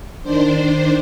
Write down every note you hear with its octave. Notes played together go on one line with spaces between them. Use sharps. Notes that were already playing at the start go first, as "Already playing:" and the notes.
D#3 D4 C5